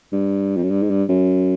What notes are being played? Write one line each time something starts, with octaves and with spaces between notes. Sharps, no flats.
G2
F2
F#2
G2
G#2
G2
F#2